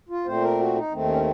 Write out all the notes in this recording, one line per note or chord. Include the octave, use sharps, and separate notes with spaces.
F4
A#2 A3 C4 C5
A#4
F#4
D#4
D#2 D#3 A3 C4
C#4